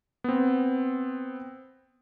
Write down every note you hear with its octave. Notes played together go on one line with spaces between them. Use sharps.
B3 C4